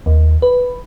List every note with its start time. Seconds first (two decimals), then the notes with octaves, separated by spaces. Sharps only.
0.06 D#2
0.42 B4